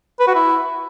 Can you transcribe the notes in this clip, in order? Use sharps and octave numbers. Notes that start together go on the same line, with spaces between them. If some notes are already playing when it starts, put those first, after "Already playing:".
B4
F#4
E4